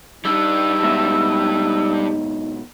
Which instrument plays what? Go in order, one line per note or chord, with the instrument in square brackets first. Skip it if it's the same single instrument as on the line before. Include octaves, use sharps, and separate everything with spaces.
[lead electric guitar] G3 D4 [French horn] D#4 [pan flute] E6
[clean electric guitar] G#2 B2 E5